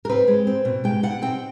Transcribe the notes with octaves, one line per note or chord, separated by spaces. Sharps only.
A#4
C4 B4
G#3
C4
B2
G#3 G5
B2 F#5
C4 G5